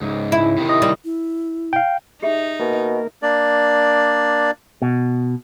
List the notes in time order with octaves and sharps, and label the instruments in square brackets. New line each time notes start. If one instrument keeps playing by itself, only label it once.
[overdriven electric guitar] C#2 G#2
[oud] E4
[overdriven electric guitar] C3 D#3
[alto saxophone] D#5
[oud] G3
[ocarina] E4
[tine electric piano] F5 G5
[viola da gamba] D#4 [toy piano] G4 G#4 E5
[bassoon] B2 [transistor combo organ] A#3 A#4
[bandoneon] A#3 D4 D5
[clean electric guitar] B2